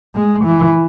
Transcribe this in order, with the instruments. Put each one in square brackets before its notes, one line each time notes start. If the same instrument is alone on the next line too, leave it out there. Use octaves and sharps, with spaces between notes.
[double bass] G#3
E3